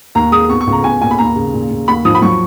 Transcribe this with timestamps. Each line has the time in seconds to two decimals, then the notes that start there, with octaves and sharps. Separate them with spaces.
0.15 D#2 A#5
0.32 G#3 D#6
0.50 B3 C#6
0.61 C#6
0.67 C#2
0.72 A#5
0.84 B3 G#5
1.01 A#2 G#5
1.11 B5
1.18 D#2 A#5
1.36 C#3
1.53 A#2
1.70 A#2
1.88 D#2 B5
2.05 F3 D#6
2.15 B5
2.22 F#3 C#6